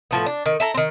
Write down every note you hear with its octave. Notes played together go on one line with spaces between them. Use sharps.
A2 F3 B3
D4
D#3
E4 A4 A#5
D#3 C4